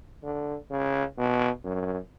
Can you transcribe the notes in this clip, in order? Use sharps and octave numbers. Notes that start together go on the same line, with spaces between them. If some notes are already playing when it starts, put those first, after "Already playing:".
D3
C#3
B2
F#2